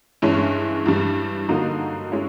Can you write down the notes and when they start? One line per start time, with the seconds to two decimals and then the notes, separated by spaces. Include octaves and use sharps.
0.22 G2 E3 G#3 C#4 E4
0.86 G2 E3 G3
1.49 D3 F#3 A#3 D#4
2.12 G#3 C#4 E4